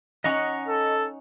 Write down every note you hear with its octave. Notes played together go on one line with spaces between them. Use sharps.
C#4 D#4 D#5 F#5 A#5 C#6
A4